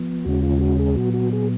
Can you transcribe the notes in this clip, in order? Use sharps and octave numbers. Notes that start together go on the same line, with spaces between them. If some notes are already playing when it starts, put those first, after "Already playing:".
Already playing: F3 B3
D#2 C#3 G#3 C#4 F#4
F4
F#4
G#4
A#2 F#3 B3 F#4
F#4
G#4